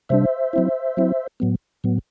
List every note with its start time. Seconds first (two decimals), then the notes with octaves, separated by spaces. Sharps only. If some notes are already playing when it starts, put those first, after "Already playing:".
0.09 C3 G3 D4 C5 E5
0.53 F#3 C4 E4
0.97 F#3 C4 E4
1.40 A2 F#3 B3
1.84 A2 F#3 B3